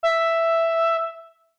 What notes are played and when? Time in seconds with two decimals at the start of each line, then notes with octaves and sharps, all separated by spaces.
0.03 E5